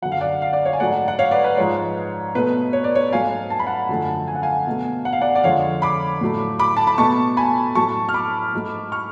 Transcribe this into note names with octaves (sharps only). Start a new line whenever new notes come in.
F#2 D3 F#3 F#5
F5
D5 F#5
F5
D5
C#5 F5
G#5
G#2 F#3 A3 D5 F#5
F#5
C#5 F5
B4 D5
B4
G#2 F3 G#3 C#5
B2 A3 B4
C#5
D5
C#5
G#2 F#3 A3 F5 G#5
A5
B5
F#5 A5
F#2 D3 F3 A3
G#5
F#5
F5 G#5
B2 A3
F#5
F5
D5 F#5
D5
F2 D3 G#3 C#5 F5
B5 D6
A2 F#3 A3
B5 D6
A5
B5
B2 A3 A5 C#6
G#5 B5
A2 F#3 A3 A5 C#6
F6
B5 D6
G#2 F#3 A3
C#6 F6